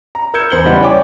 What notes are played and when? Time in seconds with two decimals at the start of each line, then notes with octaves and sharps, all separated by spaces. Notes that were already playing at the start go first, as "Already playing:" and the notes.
0.15 A#5
0.34 A#4 E6 G6 G#6 C#7 E7
0.50 E2 C5 C#7 F#7 G7
0.66 F#1 E3 G3 B4 D#5 F#5
0.82 C#5 D5 G5 G#5 C#6 D6